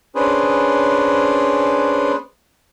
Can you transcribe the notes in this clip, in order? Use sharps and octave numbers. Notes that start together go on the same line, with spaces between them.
C#4 D4 G#4 B4 C5